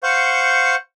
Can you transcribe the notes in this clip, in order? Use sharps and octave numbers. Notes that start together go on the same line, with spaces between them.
C5 F5 F#5 C#6 G6